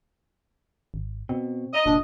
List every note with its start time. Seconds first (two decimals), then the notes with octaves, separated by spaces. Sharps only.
0.94 G#1
1.29 B2 C4
1.73 D#5
1.86 F1 A#2 D4